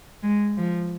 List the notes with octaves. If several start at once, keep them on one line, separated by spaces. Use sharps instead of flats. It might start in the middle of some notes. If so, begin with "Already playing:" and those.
G#3
F3